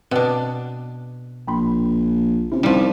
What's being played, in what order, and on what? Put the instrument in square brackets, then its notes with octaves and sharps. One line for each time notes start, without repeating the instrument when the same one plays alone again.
[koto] B2 D4 [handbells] C4 F#5 G5
[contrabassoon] A#1 [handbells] G5 B5 C6
[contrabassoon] C3 [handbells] C#4 E4
[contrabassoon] C2 [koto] F3 G3 [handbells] C#4 D#4